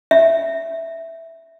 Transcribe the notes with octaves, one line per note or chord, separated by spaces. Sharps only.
E5